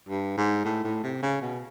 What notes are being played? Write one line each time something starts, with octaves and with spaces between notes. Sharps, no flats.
G2
G#2
A2
A2
C3
C#3
B2